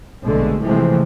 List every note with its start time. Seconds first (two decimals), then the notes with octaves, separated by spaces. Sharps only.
0.23 A#1 B2 D3 G#3 A3
0.62 C3 E3 F3 G#3 A3 C4